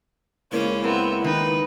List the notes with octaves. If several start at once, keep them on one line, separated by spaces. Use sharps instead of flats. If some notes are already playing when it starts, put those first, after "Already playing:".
C#2 A#2 C#4 E4 C5
B3 C4 A#4 E5
D#3 D#4 B4